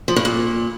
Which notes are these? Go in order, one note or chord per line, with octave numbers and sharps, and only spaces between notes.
F3
G2
A#2